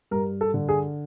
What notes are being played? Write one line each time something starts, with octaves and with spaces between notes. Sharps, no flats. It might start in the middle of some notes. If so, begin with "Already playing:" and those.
G2 A#4
A4
D3
G#4